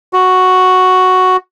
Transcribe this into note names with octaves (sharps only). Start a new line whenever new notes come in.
F#4